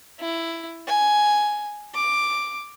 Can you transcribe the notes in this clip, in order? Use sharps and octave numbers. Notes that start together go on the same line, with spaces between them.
E4
G#5
D6